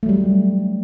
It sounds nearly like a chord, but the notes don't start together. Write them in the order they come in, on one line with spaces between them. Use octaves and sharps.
A3 F#3 G3